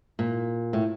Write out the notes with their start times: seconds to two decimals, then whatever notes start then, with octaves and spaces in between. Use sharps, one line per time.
0.19 A#2
0.73 A2